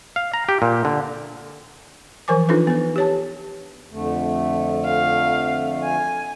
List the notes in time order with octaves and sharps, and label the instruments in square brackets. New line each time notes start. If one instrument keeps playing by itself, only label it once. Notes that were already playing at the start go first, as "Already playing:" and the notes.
[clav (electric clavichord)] F5
A#5
G4
A#2
D3
[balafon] E3 F3 A#4 C5 G#5 D6
D4 D#4 F4 A4 B4
B3 B4
G4 C#5 A5
[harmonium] F2 D3 A3
[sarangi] F5
G#5